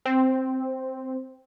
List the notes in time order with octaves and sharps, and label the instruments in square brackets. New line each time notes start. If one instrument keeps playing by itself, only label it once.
[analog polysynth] C4